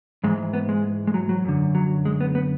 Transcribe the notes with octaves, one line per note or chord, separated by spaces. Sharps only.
G#2 E3 G#3
B3
G#3
G#3
F#3
F#3
F#2 D3
F#3
G#3
B3
B3